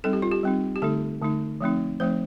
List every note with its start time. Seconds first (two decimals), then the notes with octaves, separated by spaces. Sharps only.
0.04 G3 C4 D#4 A4
0.13 G4
0.22 F4
0.32 G4
0.43 G3 C4 D#4
0.76 G4
0.82 D3 A3 D#4 A4
1.22 D3 A3 D#4
1.61 F3 A3 C4 D#4
2.00 F3 A3 C4 D#4 C5